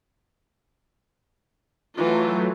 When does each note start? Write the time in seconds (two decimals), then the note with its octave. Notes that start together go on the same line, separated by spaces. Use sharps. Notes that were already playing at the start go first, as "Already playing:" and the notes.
1.95 E3 F#3 A3 F4